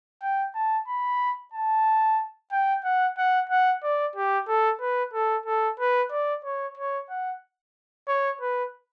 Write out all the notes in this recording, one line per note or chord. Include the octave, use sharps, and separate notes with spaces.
G5
A5
B5
A5
G5
F#5
F#5
F#5
D5
G4
A4
B4
A4
A4
B4
D5
C#5
C#5
F#5
C#5
B4